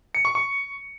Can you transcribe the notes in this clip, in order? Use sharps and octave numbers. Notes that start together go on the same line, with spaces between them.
C#7
C#6
C#6